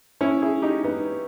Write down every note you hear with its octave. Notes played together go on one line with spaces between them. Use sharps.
C#4 E4
E4 G#4
D#4 G4
B3 D#4